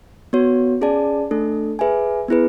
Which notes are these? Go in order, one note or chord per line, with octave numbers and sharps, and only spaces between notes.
B3 F#4 C#5
C#4 G#4 D5 A5
A3 D4 A4
G#4 B4 E5 G#5
B3 E4 G#4 B4